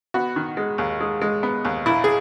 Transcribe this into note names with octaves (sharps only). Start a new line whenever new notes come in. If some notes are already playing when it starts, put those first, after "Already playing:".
B3 F#4
D#3
G#3
D#2
G#3
G#3
B3
D#2
A#1 E4
G#4